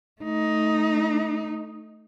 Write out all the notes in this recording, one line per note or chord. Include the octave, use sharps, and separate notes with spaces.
A3 D#4